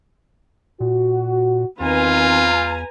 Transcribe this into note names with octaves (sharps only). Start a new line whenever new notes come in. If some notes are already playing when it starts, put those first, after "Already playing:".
A#2 F#4
E2 D#3 C4 F4 B4 G#5 A#5